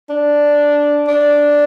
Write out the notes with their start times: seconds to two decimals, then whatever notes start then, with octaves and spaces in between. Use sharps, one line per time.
0.09 D4
1.08 D4